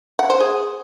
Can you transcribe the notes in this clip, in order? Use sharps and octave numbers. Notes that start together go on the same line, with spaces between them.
F#5
C5
G#4